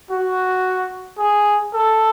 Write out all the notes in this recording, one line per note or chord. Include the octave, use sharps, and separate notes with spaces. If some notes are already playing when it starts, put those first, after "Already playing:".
F#4
G#4
A4